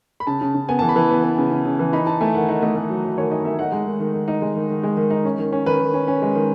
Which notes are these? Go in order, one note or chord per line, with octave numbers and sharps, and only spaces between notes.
B5
C#3 A5
C#3
C#3
B3 G#5
E3 A5
B5
E3
B3
B3
C#3
C#3
C#3
E3
D#4 B5
D#4 A5
A3 G#5
D#3 F#5
D#4 F#5
A3 D#5
A3
F#3
F#3
D#3 C#5
D#4 D#5
A3 E5
D#4 F#5
G#3
D#3
D#3
D#3
D#4
G#3
D#3
D#3
G#3
D#3
D#4
C#4
D#3
C#4
D#3 B4
D#3
C#4
C#4
G#3
D#3